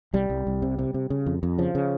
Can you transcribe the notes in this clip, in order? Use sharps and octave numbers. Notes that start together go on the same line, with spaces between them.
C2 G3
C2
C2
C3
C3
C3
C#3
F2
F2
C#3 F3
C#3